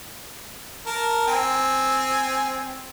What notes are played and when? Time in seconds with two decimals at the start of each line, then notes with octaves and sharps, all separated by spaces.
0.87 A#4 A5
1.27 C4 G#5